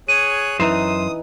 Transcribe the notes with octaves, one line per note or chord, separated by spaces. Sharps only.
G#4 C#5 F#6 D#7
F#2 E3 D#4 C5 D#6